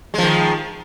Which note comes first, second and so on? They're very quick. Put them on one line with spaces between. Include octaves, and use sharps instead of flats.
G#3 F3 D#3